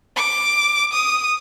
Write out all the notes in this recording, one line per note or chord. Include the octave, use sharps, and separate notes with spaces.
D6
D#6